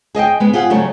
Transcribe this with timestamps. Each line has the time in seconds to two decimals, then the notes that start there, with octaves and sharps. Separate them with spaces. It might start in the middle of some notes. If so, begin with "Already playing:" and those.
0.15 G#4 D#5 E5 G5
0.40 G#3 B3
0.53 F4 G4 G#4 F#5
0.70 C#3 F#3 G3 A3 C#4